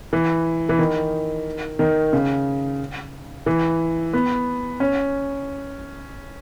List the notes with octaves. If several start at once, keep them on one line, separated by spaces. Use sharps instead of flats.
E3
E3
D#3
D#3
C#3
E3
B3
C#4